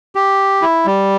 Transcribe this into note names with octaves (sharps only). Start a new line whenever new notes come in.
G4
E4
G3